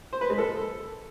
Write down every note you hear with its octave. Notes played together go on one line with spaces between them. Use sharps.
C5
B4
G#3
A4